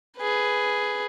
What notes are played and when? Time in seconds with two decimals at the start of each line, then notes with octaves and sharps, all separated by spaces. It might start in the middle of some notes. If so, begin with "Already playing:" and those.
0.18 G#4 B4